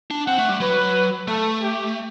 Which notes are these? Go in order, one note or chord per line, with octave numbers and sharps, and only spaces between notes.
D4
C4 F#5
A3
G3
F#3 B4
A3 A4
G4